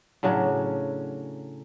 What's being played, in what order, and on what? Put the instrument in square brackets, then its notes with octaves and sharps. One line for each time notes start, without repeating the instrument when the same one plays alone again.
[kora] A2 C#3 F#3 D4